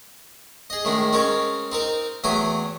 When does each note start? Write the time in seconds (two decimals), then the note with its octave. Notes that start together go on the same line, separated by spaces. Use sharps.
0.70 G#4 D#5
0.85 A2 D#3 G#3 D4
1.13 G#3 C4 C#4 A#4 C#5
1.72 C4 D#4 A#4
2.24 E2 F#3 A3 G5 G#5 D#6